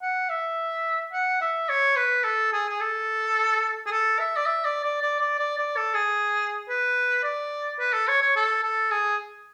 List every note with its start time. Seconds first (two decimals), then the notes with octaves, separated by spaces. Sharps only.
0.02 F#5
0.30 E5
1.13 F#5
1.41 E5
1.69 C#5
1.96 B4
2.24 A4
2.53 G#4
2.69 G#4
2.80 A4
3.87 G#4
3.91 A4
4.19 E5
4.37 D5
4.46 E5
4.65 D5
4.84 D5
5.02 D5
5.20 D5
5.39 D5
5.58 D5
5.77 A4
5.94 G#4
6.69 B4
7.24 D5
7.79 B4
7.93 A4
8.08 C#5
8.22 C#5
8.36 A4
8.63 A4
8.91 G#4